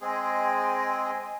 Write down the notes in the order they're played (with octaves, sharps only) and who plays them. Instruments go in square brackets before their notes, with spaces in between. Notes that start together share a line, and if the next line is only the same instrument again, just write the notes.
[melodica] G#3 C4 G#4 [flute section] D#5 G5 G#5